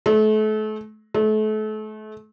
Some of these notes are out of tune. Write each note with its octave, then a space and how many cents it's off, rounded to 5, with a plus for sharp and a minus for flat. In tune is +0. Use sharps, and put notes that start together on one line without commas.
A3 -35
A3 -35